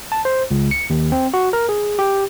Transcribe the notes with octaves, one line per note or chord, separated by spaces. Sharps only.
A5
C5
C#2
C#7
D#2
C4
F#4
A#4
G#4
G4